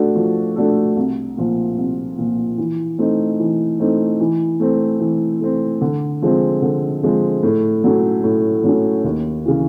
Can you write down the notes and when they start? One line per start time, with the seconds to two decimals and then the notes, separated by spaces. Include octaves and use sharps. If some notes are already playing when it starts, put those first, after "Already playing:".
Already playing: A3 D4 F#4 A4
0.15 F3
0.56 A3 D4 F#4 A4
0.96 C2
1.37 A#2 F3
1.77 C2
2.18 A#2 F3
2.58 E3
2.99 A3 C4 D#4
3.39 E3
3.79 A3 C4 D#4
4.20 E3
4.60 A3 C4
5.00 E3
5.41 A3 C4
5.81 D3
6.22 F3 G#3 C4
6.62 D3
7.03 F3 G#3 C4
7.43 A2
7.84 F#3 A3 C#4
8.24 A2
8.64 F#3 A3 C#4
9.04 D#2
9.45 C#3 E3